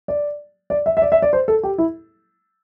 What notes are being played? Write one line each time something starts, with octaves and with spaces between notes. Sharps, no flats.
D5
D5
E5
E5
D5
E5
D5
C5
A4
G4
E4